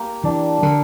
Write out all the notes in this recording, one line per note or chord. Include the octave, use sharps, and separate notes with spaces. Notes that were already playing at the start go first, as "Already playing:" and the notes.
Already playing: A#3 G4
E3 D4
D3 A#4